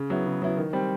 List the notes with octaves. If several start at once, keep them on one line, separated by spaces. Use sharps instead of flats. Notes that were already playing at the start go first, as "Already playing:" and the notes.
Already playing: C#3
F#3 B3 E4
C#3
F#3 B3 E4
D#3
G3 C4